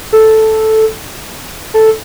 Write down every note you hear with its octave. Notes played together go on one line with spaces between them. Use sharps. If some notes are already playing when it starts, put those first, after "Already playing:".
A4
A4